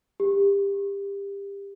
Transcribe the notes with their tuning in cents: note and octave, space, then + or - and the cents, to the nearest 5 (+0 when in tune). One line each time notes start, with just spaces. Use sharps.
G4 +25